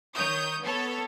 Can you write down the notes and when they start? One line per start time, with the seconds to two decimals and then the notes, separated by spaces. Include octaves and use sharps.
0.16 D#3 C#5 D#6 G6
0.62 B3 A4 C#5